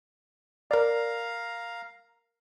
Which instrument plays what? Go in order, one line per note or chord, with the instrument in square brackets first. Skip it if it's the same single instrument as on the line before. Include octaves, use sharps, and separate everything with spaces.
[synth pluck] A#4 D5 [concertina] F5 A#5